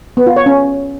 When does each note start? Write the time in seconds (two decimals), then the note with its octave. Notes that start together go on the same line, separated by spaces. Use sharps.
0.17 B3
0.27 F4
0.36 C#5
0.46 C#4